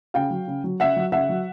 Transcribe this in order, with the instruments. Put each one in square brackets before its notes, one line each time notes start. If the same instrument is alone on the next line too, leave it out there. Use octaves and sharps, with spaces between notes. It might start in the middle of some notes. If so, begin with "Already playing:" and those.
[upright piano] C#3 F5 G5
F#3
C#3
F#3
C#3 E5 F#5
F#3
C#3 E5 F#5
F#3